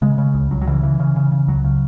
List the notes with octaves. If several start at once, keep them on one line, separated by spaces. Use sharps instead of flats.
C#3 G#3
C#3
C#2
C#2 F#3
F#3
C#3 E3
C#3 E3
C#3
C#3
C#3
C#2 F#3
C#3